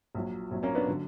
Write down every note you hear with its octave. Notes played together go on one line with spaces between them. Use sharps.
A#1 A#2 F#3
A#1 A#2 F#3
A#3 C#4
B3 D4
D3 F#3